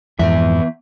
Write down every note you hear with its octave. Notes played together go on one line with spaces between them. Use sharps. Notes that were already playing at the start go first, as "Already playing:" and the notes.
F2 G#2 E3 B3 E5